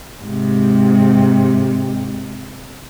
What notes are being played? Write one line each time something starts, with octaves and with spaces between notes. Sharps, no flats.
G#2 C3